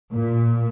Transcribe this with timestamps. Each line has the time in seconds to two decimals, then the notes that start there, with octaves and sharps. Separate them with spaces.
0.14 A#2